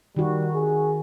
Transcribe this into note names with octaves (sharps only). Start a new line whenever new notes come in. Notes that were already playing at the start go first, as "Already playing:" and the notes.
D#3 G3 F#4
G#4